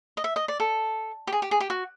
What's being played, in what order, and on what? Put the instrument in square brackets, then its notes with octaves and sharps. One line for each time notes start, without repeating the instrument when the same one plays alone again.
[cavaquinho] D#5
E5
D#5
D5
A4
G4
G#4
G4
G#4
G4
F#4